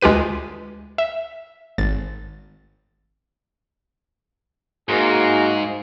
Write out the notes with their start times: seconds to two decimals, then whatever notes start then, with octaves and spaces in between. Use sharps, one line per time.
0.01 D2 G#3 F4 G4 B4 D#7
0.98 E5
1.78 G#1 A6
4.89 G#2 A#3 F#4 G#4